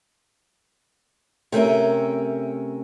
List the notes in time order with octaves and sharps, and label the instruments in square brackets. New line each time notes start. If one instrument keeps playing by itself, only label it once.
[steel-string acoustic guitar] C3 A3 C#4 A#4